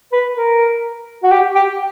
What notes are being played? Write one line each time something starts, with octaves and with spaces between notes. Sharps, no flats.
B4
A#4
F#4
G4
G4